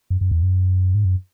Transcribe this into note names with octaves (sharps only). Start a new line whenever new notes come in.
F#2
F#2
E2
F#2
G#2
F#2